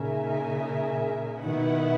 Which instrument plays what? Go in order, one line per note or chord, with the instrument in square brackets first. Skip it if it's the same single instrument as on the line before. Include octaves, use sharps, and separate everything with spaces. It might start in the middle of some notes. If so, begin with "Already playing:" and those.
Already playing: [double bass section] A#2 C#3 [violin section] D#4 A#4 E5 G#5
[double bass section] B2 D#3 [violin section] B3 E4 B4 F#5